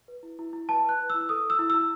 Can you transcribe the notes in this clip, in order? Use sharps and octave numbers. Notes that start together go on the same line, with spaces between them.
B4
E4
E4
E4
B4 A5
B4 F#6
B4
E4 E6
A4 D#6
A4
E6
E4
E4 E6